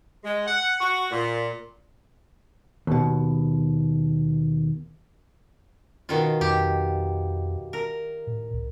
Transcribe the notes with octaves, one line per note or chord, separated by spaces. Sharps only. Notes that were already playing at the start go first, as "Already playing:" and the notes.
G#3
F#5
F#4
A#2
D#2 B2
B2 D#3 F4
F2 G4
A#4
A2
C2